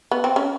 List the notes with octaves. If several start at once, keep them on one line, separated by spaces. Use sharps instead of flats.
B3
C4
C#4